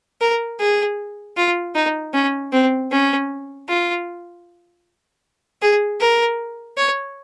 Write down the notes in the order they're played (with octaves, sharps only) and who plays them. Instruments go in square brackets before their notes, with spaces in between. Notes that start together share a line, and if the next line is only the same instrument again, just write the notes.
[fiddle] A#4
G#4
F4
D#4
C#4
C4
C#4
F4
G#4
A#4
C#5